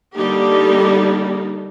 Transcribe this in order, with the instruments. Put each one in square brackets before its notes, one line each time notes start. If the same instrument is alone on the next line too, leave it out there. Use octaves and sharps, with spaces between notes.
[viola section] D3 G3 A#3 D#4 G4